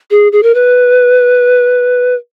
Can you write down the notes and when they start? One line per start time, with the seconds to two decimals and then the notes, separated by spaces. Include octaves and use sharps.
0.11 G#4
0.32 G#4
0.43 A#4
0.54 B4